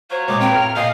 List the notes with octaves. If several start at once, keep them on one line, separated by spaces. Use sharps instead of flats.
F#3 F4 C5 C#5
A#2 G#3 D6
C4 A#4 B4 G5
A2 A#5 F6
A#2 G#4 C5 D#5 F5